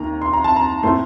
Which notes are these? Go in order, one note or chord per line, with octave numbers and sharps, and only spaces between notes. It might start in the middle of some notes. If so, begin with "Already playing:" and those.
Already playing: D#2 D#3 A#3 A#5
C6
A#5
A5
A#5
A2 A3 C4 C6